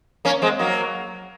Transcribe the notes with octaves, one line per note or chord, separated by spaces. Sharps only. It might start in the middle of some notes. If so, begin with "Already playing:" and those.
A#3 C#4
G#3 C4
F#3 A#3